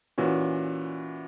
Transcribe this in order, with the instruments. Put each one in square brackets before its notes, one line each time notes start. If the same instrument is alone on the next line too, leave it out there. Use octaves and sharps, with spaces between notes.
[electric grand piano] A#2 E3 C#4 F#4